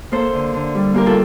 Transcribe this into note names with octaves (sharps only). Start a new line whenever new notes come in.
A#3 A4 C5
D3
D3
G3
A#3 G4 A#4
F4 A4